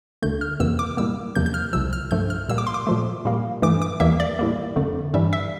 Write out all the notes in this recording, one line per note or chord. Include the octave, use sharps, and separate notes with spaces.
D2 D3 A3 G6
F6
F2 C3 E3 A#3 E6
D6
A2 G3 A#3 E6
E2 C3 F3 A#3 G6
G6
F6
C2 C3 F3 E6
F6
G2 F3 A3 G6
F6
A#2 G3 A#3 E6
D6
C6
D6
A#2 F3 A3
A#2 G3 A#3
G2 E3 A3 D6
D6
E2 E3 G3 A#3 E5
D5
A2 G3 A#3
F2 D3 A3
G2 E3 G3 E5
E5